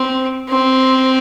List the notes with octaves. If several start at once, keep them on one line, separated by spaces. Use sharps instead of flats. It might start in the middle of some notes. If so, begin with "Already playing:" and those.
Already playing: C4
C4